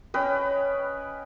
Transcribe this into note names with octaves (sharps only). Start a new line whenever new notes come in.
C#4 B4 D#5 G5